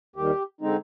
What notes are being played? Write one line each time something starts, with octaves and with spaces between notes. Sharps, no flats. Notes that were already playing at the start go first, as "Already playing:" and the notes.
D#2 D#3 G3 G4
D3 G#3 C4 D#4